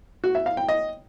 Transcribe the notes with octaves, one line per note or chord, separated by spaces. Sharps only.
F#4
E5
F5
G5
D#5